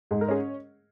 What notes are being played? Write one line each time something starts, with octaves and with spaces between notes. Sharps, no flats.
G#2 G#4
A#4
C#4 G#4